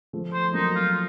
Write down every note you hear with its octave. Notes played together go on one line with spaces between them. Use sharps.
F3 A3
C5
F#3 A#3 D#4
F4